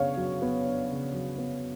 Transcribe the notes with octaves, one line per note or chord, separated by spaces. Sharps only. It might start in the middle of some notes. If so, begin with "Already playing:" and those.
Already playing: C#3 B3 D4 C#5 F5
F#3
B3
D4
C#3
F#3
B3